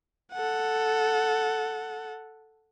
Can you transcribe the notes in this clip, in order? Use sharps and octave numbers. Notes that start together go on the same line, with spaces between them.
A4 F#5